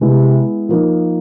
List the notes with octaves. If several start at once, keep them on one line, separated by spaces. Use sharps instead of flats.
C3 G#3 B3 E4
F3 A#3 D#4